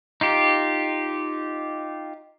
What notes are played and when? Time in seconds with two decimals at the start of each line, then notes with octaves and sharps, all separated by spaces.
0.21 D#4 F4 G4